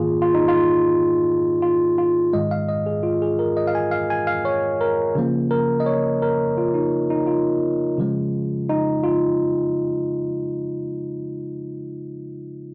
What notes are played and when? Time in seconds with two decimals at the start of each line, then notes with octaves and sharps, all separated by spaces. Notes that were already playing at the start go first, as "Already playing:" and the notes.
Already playing: G#2 D#3 A#3 F4 G#4
0.22 F4
0.34 D#4
0.48 F4
1.62 F4
1.98 F4
2.33 G#2 D#3 G#3 D#5
2.51 F5
2.69 D#5
2.86 G#4
3.03 F4
3.22 G#4
3.39 A#4
3.57 D#5
3.67 F5
3.75 G#5
3.91 F5
4.10 G#5
4.27 F5
4.45 C#5
4.81 A#4
5.15 C#3 F3 A#3
5.51 A#4
5.80 D#5
5.86 C#5
6.22 A#4
6.58 F4
6.74 D#4
7.10 D#4
7.27 F4
7.98 C#3 F3 G#3
8.69 D#4
9.04 F4